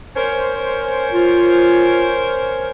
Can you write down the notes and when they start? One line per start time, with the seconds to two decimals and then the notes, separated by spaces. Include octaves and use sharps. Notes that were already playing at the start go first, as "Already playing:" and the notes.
0.16 C#4 A#4 C5
1.13 F4